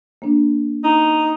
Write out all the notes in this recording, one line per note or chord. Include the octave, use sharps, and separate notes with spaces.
A#3 D4
D#4